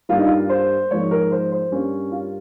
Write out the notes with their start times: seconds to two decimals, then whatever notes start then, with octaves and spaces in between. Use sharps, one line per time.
0.09 G2 G3 A#3 F4
0.18 D#4
0.27 F4
0.50 C5
0.91 G#2 F3 A#3 C#5
1.11 A#4
1.32 C5
1.52 C5
1.71 G2 G3 A#3 C#4
2.12 F4